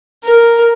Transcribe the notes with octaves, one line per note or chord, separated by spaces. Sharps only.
A#4